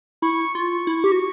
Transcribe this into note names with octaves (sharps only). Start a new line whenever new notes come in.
E4 C#6
F4 C#6
E4
G4
F#4